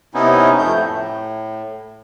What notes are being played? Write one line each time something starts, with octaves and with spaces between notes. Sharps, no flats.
C3 B3 C#4 D#4 E4
F2 A3 G6
A2